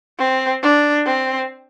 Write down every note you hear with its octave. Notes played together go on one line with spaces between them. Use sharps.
C4
D4
C4